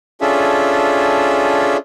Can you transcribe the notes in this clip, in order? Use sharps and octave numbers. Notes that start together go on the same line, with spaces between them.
C#4 D4 F4 G#4 A4 E5